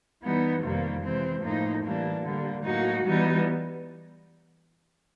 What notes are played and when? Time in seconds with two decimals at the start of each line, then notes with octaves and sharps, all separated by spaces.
0.22 E3 G3 B3 D#4
0.62 F2 C3 D#3 G3 A#3
1.03 C3 E3 G#3 C4
1.43 A2 F3 A#3 D#4
1.83 A2 E3 G3 A#3 D4
2.23 D3 G3 A#3
2.64 A2 F#3 A#3 D#4 F#4
3.05 E3 G3 B3 D#4